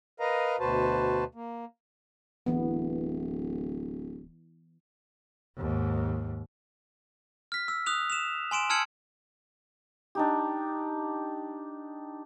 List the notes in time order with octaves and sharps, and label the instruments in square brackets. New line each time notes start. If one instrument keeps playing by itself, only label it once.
[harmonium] A#4 B4 D#5 F5 A#5
D2 B2 F#4 B4 C5 A5
A#3
[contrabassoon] D1 [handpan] E3 B3
[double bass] D#2 G#2
[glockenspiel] F6 B6
E6
D#6 F#6 F7
E7 F7
G#5 C6 D7 E7
A5 E6 F6 G#6 C#7 F#7
[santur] D4 D#4 G4